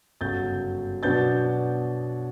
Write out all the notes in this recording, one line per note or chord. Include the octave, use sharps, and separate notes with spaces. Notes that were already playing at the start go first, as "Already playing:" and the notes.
G1 F#2 C#3 F#3 G6 A6
B2 F#3 B3 D4 G6 A6